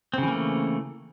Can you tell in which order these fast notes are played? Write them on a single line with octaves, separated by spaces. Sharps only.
C4 C#3 E3 A#3 A3